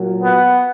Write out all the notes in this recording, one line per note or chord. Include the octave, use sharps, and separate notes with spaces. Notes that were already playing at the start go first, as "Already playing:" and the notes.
Already playing: A#2 F#3
B3